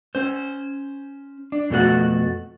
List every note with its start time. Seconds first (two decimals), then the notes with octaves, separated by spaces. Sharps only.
0.15 C#4 C5
1.52 D4
1.70 F2 B2 A3 F#4 F#5